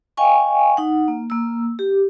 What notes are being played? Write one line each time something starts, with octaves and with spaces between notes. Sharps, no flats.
D#5 F5 G5 G#5 C#6
D#4 F#5
A#3
A#3 E6
G4